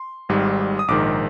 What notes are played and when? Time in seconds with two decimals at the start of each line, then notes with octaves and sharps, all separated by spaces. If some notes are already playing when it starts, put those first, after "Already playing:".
Already playing: C6
0.29 G#1 G#2 G3
0.79 D#6
0.88 A#1 G#2 D#3 D6